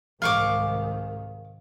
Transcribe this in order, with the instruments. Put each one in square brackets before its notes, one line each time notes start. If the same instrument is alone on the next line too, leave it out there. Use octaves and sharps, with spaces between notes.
[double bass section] C2 G#2 D#3 [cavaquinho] F5 C#6 D6